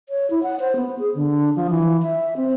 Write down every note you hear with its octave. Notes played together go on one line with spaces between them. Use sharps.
C#5
E4
F#5
C5
B3
G#4
D3
F3
E3
E5
C4